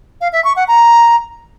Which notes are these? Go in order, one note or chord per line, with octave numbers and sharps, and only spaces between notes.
F5
E5
C#6
F#5
A#5